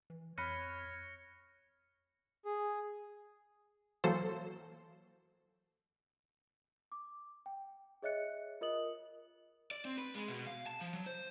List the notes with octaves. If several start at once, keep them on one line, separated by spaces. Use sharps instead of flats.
E3
F2 C#5 B5 F6 F#6 A#6 C#7 D#7
G#4
E3 F#3 A#3 A4 C5
D6
G5
G#4 C#5 D#5 E5 F#6 C#7
F4 A#4 D#5 D#6 F#7
D5
C4
B4
G#3
B2
F5
A5
F3
F#3
C5